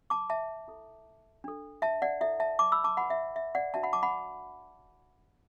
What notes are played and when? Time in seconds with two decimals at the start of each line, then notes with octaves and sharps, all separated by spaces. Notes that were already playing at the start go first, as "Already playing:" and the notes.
0.10 A5 D6
0.30 E5 A5
0.68 E4 A4
1.44 D4 A4
1.82 E5 A5
2.02 D5 F#5
2.21 E4 A4 E5
2.40 E5 A5
2.59 A5 D6
2.72 B5 E6
2.84 A5 D6
2.97 E4 B4 F#5 B5
3.10 E5
3.36 E5
3.55 D5 F#5
3.74 D4 F#4 B4 E5 A5
3.83 F#5 B5
3.93 A5 D6
4.03 F#5 B5